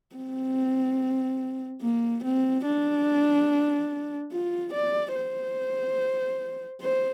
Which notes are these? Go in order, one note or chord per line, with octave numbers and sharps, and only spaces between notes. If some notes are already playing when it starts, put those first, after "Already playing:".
C4
A#3
C4
D4
F4
D5
C5
C5